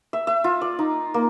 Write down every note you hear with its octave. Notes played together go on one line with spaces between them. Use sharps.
E5
E5
F4
D5
D#4
A#3